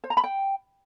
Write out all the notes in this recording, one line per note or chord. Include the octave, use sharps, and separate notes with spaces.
C5
A#5
B5
G5